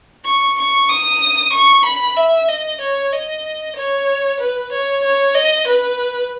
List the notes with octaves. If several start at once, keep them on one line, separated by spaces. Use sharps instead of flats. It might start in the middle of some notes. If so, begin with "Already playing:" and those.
C#6
C#6
D#6
C#6
B5
E5
D#5
C#5
D#5
C#5
B4
C#5
C#5
D#5
B4